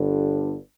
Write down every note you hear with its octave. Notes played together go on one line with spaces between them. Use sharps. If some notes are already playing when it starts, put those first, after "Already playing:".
Already playing: G1 G2 D3